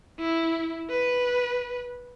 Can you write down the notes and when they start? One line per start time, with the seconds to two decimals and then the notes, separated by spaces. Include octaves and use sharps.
0.19 E4
0.90 B4